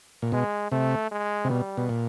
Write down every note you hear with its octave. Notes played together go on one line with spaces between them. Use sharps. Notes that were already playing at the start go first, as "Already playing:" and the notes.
A#2
B2 G#3
C3 A3
G#3
C3
B2 G3
B2
A#2